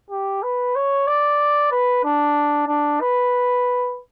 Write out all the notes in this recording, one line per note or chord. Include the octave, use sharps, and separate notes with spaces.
G4
B4
C#5
D5
B4
D4
D4
B4